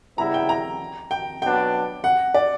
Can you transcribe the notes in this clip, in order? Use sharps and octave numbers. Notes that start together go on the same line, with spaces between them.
C#3 G3 B3 E4 A#5
G5
A#5
G5
B2 F#3 B3 D4 G5
F#5
D5